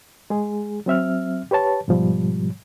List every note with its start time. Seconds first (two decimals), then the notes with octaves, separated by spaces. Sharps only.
0.30 G#3 G#4
0.86 F#3 C4 E5 F6
1.51 G4 B4 C#5 A5
1.88 G#2 B2 F3 G3